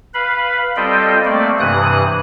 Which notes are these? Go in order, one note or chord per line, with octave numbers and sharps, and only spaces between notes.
B4 F5 B5
G3 C4 F4 A4 D#5 G5
A3 A#3 C4 D5
G2 C3 E3 D#6 F#6